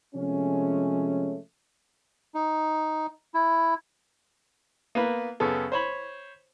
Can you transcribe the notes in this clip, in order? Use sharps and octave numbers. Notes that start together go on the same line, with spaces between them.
C3 F3 G#3 A3 C#4
D#4
E4
A#3 B3 B4
F#2 C#3 B3 A4
C5 C#5 B5